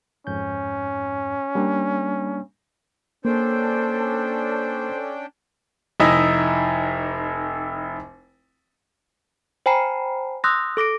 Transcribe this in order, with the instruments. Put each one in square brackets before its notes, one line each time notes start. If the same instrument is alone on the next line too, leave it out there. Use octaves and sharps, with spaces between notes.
[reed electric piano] F2 G#2 G6 [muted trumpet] C#4
[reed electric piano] G3 A#3 D4
[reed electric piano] A#3 [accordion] C#4 D4 G5 [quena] A4 [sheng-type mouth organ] C5
[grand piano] F1 D#4 E4 D#5 E5
[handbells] C5 G5 G#5 A#5 B5 C7
C6 D#6 E6 F#6 G6 A#6
A4 D6 A#6 D7